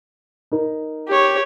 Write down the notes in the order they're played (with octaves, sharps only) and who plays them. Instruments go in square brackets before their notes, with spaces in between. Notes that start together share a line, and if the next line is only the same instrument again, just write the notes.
[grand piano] D#4 A#4
[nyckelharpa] G4 C#5